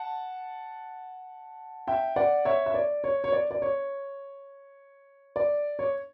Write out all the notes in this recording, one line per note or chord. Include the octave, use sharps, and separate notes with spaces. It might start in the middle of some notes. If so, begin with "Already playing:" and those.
Already playing: F#5 A5
E5 G5
D5 F#5
C#5 E5
E5
D5
C#5
C#5
D5
D5
C#5
D5
C#5